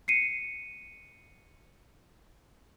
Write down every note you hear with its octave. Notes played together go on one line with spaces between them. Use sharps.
C7 C#7 D#7